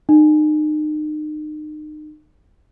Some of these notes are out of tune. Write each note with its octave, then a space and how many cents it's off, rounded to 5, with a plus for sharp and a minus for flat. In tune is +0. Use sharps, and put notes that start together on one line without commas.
D#4 -35